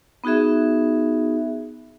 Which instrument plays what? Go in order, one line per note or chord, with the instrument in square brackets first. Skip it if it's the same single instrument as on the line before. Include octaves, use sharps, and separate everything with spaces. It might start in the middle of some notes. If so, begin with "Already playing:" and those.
[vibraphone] B3 D#4 F#4 G#4 E5